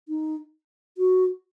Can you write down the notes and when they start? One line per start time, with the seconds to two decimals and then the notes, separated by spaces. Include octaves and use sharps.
0.09 D#4
0.98 F#4